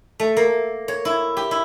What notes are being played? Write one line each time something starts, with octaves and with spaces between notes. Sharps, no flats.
A3
A#3
C#5
E4
G4
E4